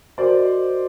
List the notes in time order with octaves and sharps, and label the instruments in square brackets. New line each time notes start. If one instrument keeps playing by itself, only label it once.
[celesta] F#4 A#4 D#5 [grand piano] C5 D5